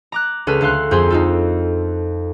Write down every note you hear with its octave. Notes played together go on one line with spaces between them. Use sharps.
A#5 D6 F#6
C#2 C#4 A4 B4 F6 D#7
D2 A4 F5 C6 F#6
F2 C4 G#4 G#5 C6
D#4 F4 A4